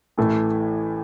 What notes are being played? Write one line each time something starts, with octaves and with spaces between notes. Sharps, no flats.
A1 A2 E3 A3